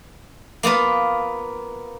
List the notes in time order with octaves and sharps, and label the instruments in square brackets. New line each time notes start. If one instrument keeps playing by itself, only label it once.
[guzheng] A#3 B3 F4 B4